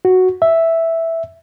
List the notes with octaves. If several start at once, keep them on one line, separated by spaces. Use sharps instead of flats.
F#4
E5